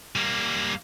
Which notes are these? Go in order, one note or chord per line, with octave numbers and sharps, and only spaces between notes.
G3 A#3